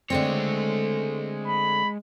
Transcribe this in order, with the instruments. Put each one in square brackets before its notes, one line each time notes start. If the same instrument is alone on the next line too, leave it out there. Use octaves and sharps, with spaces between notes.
[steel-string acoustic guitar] D3 A3 C4 [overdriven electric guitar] G#3 C#5
[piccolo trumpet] B5